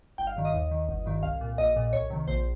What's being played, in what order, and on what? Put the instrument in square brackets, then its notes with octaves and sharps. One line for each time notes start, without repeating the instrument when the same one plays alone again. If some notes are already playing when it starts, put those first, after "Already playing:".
[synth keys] G1 G5
F5
G2 D#3
D#5
D#2
D#3
G1
G2 D#3
C2 F5
A#2
A#1 D#5
A#2
C2 C#5
C3 D#3
A#1 C5